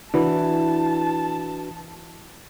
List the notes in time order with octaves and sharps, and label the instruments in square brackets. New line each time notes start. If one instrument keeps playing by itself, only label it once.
[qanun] E3 [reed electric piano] D4 F#4 B4 [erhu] A5